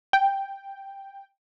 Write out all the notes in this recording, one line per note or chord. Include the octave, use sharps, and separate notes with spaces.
G5